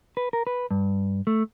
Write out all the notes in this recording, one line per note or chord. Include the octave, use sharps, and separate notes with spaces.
B4
A#4
B4
G2
A3